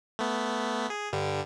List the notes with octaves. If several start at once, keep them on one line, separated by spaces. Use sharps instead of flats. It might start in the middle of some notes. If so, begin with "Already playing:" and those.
A3 B3
G#4
G2 D3 G3